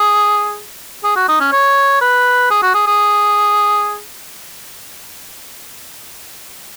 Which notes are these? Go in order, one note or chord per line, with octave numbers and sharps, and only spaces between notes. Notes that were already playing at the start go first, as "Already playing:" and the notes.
Already playing: G#4
G#4
F#4
D#4
C#4
C#5
B4
G#4
F#4
G#4
G#4